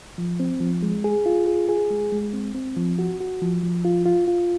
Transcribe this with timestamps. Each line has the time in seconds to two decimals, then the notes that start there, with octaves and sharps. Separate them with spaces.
0.18 F3
0.40 C4
0.60 F3
0.83 G#3
1.04 G#4
1.26 F4
1.47 G#4
1.69 G#4
1.90 G#3
2.12 G#3
2.33 C4
2.55 C4
2.76 F3
2.99 F#4
3.20 F#4
3.42 F3
3.63 F3
3.85 F4
4.06 F4
4.28 F4